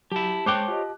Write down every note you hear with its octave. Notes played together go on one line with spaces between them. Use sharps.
F#3 E4 G4 A5
G#3 C5 C#5 G5 D6 F#6
F4 G4 D#5